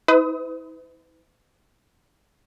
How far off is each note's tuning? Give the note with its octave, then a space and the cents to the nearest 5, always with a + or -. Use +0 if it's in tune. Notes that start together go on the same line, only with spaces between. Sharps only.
E4 -40 B4 +45 D#6 +30